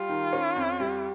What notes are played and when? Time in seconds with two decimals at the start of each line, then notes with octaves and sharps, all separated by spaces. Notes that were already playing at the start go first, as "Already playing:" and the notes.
Already playing: G3 F4
0.09 D#3
0.33 C#4
0.56 F2
0.80 G3